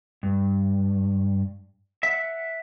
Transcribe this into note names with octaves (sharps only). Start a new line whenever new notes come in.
G2
E5 F#5